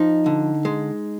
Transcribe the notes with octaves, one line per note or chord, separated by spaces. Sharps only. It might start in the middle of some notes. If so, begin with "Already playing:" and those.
Already playing: F3 D#4
D3
G#3